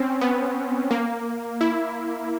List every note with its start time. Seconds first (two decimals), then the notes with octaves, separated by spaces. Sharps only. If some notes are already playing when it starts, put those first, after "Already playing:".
Already playing: C4 C#4
0.21 B3
0.91 A#3
1.61 E4